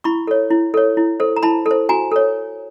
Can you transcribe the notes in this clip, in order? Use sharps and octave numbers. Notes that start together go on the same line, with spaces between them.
E4 B5 C#6
A4 C#5
E4
A4 C#5
E4
A4 C5
A#5
E4 A5 B5
A4
C5
F#4 G#5 A#5
A4 C#5